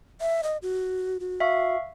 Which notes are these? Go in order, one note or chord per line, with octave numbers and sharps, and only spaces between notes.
E5
D#5
F#4
F#4
E5 F5 C#6